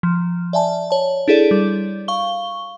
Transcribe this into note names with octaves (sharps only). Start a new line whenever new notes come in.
F3
D5 E5 G#5 A5
C#5 A5
D4 E4 G#4 A4 D5
G3
F5 C#6 G7